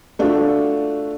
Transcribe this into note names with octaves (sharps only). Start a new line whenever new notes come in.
A3 D4 F4 F#4